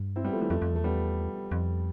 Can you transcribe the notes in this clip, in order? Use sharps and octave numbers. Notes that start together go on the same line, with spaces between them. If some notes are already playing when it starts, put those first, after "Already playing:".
Already playing: G2
C4 E4
G3 B3
F3 A3
E3 G3
F2 F3 A3
F2
E2 A3
G3 B3
F2